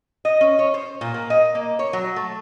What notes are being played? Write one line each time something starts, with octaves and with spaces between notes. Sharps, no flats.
D#5
C#4
C#5
C5
A#2
A#3
D#5
A#3
C#5
F#3
A3